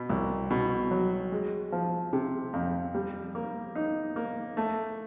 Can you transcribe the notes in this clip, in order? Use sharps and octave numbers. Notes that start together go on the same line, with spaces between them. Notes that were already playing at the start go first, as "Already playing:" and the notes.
Already playing: B2
C2
B2
F#3
G#3
F3
C3
F2
G3
A#3
D#4
A#3
A3